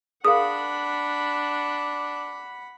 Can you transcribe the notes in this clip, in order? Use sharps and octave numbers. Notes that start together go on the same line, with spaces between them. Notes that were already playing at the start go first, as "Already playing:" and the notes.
D4 G#4 A#4 F5 F#5 B5 D#6